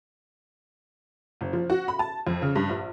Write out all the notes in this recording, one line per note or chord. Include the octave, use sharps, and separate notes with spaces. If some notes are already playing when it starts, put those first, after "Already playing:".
F#1
F3
F#4
B5
A5
F2
C#3
G2
A#1